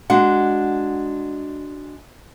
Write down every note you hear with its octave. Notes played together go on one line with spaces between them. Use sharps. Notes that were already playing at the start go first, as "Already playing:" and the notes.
G#3 D4 F#4 D#5 F#5